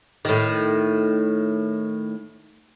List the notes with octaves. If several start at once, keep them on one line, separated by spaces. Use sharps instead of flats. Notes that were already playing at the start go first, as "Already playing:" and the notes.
A2 D#3